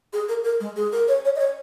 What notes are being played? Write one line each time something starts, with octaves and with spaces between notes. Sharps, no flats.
G#4
A#4
A#4
G#3
G#4
A#4
C#5
C#5
D#5
C#5